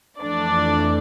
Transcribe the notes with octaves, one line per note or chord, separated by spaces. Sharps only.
F2 E3 A3 D4 D5